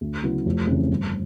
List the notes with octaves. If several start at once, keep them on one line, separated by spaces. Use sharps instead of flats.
D2
C#3 F#3 B3 E4
F1
F2 C#3 E3
G1